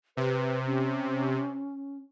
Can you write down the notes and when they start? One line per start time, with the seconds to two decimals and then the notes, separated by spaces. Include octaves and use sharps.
0.17 C3 B4
0.67 C#4